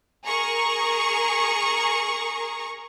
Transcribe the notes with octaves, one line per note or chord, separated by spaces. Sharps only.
G#4 A#4 A#5 C#6